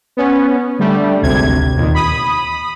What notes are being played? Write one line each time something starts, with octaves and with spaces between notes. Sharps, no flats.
B3 C#4
D3 G3 A3
G#1 D2 C3 G#6
D#2 A#2 D#3
B5 D#6